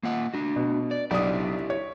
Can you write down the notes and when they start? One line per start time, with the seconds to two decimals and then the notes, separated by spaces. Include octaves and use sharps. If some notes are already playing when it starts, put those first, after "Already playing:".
0.03 A#3 F4 F#5
0.34 D4 F#4
0.56 B2
0.91 D5
1.11 B1 D4 E4 G4 D5 D#6
1.70 C#5